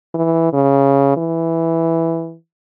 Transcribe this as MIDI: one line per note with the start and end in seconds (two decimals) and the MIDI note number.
0.15 0.52 52
0.53 1.12 49
1.17 2.35 52